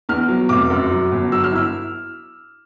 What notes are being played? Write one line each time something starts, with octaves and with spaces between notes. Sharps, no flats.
E2 F6
F#3
F1 D6
F#2
F#3
G1
F#3 E6
F6
E4 E6